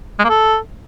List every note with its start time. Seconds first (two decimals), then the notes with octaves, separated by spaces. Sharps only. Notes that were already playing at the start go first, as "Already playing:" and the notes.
0.19 G#3
0.24 A#3
0.29 A4